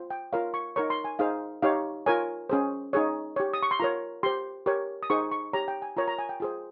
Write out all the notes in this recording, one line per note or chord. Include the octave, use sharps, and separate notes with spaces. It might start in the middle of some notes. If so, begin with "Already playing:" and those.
Already playing: F4 C5
G5
F4 A#4 C#5 F5
C#6
D#4 A#4 C#5 C#6
C6
G#5
D#4 G#4 C5 F5
D#4 G4 C#5 F5
F4 A#4 C#5 G#5
C#4 G#4 C5
D#4 G#4 C#5
G4 C#5
D#6
C#6
C6
F4 A#4 C#5 A#5
G4 C5 C6
G4 A#4 C#5
D#6
D#4 G#4 C5 C#6
C#6
G4 C#5 A#5
G5
G#5
F4 A#4 C#5 A#5
A#5
G#5
G5
F4 G#4 C5